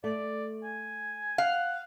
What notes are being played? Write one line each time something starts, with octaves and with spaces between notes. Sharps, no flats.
A3 D5
G#5
F5 F#5